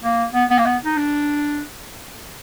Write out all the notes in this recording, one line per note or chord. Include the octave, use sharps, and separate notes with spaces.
A#3
B3
B3
A#3
B3
D#4
D4